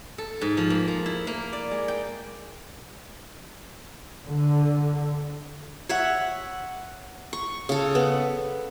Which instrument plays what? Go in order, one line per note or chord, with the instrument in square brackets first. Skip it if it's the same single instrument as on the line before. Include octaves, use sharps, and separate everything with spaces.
[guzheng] A4
G#2
F3
A#3
F3
E4
A#3
D5
G#3
G5
[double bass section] D3
[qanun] C#5 E5 F#5
C#6
C#3 A4
B3